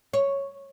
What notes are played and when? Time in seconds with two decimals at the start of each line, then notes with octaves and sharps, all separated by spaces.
0.13 C#5